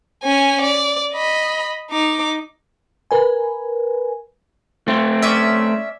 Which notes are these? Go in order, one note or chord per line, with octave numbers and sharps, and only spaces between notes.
C#4 G#5
D5
D#5 B5
D#4 D6
A#4 B4 G#5
A3 C4
C#4 D5 E5